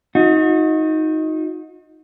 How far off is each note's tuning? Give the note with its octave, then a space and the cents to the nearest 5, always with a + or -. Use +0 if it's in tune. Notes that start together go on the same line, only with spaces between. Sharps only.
D#4 +15 F#4 -35